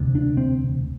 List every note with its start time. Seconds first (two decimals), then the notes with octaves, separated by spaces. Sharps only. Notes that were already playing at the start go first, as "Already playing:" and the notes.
Already playing: E1 D2 C3
0.15 D4
0.37 C4